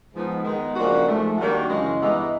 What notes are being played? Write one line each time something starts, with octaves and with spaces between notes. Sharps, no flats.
G#2 F3 G#3 B3 D#4
D#3 G#3 B3 D#4
C#3 F3 A#3 D4 F#4
G#2 F3 A3
D#3 G3 A#3 D4 F#4
F#2 C#3 E3 G#3
G2 E3 G#3 B3 D#4